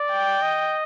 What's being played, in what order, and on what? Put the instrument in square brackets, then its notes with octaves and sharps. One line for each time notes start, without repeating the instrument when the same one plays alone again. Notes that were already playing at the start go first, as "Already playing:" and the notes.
Already playing: [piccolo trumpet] D5
[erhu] G5
[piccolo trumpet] D#5